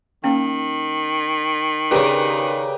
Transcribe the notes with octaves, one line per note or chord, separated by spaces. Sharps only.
D#3 A#3 C#4 G5
C#3 D4 G4 A#4 B4